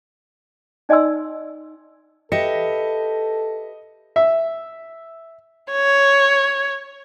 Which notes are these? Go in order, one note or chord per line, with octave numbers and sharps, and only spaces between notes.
D#4 D5 D#5 G#5 C6 E6
G4 A4 B4 D#5 E5 A#6 C#7
E5
C#5